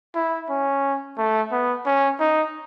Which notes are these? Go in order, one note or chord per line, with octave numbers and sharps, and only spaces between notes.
E4
C#4
A3
B3
C#4
D#4